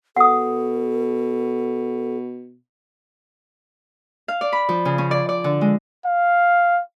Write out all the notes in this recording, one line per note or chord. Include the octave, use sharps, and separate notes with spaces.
B2 A4 F#5 D#6
F5
D5
B5
F3
C#3
C#4
D5
D5
D3
G#3
F5